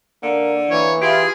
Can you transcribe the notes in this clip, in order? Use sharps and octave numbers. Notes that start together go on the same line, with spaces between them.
D3 A#3
E3 A#3 C#5
E4 F4 G4 G#4